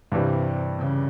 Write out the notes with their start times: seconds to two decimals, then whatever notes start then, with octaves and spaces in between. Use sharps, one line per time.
0.12 G2 C3 E3 G3
0.78 C#3